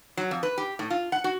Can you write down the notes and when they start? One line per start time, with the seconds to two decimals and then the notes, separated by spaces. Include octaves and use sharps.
0.17 F#3
0.31 F2
0.43 B4
0.58 G4
0.79 A2
0.90 F4
1.12 F#5
1.24 F#4